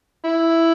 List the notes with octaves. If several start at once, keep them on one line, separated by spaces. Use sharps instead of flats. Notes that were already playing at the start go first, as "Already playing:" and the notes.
E4